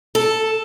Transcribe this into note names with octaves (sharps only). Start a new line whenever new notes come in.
A4